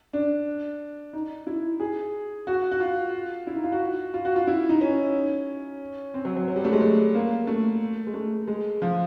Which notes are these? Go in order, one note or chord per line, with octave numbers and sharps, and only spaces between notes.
D4
D#4
E4
G#4
F#4
F#4
F4
E4
D#4
F4
F#4
F4
F#4
F4
E4
D#4
C#4
C4
F#3
F#3
F#3
G3
A3
G#3
A3
A#3
A3
G#3
A3
G#3
F3